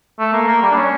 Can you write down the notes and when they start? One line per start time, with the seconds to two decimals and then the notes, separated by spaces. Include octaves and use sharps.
0.19 A3
0.33 A#3
0.47 A#3
0.62 G3
0.71 D4
0.77 C#4